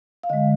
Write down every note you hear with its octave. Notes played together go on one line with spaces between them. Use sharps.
F5
D3 G#3 D#5